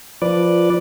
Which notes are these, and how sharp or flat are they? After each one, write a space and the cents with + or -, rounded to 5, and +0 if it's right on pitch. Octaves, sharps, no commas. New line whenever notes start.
F3 -10 B4 -10 D5 +0